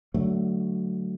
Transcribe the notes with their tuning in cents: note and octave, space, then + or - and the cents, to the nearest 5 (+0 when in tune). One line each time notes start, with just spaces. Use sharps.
D3 +0 F#3 +15 A3 +0